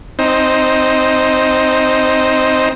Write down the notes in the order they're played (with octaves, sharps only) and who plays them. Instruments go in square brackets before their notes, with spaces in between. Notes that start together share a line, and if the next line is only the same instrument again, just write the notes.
[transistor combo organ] C4 D#4